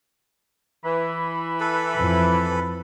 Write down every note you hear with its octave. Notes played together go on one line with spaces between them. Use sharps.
E3 B5
A4 B4
F2